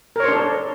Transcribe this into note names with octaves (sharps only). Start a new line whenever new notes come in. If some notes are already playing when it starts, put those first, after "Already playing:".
D4 A4 A#4 C5 C#5